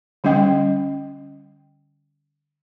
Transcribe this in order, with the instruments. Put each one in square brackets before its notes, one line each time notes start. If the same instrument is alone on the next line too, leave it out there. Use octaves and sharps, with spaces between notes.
[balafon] D3 G3 C#4 D#5 G5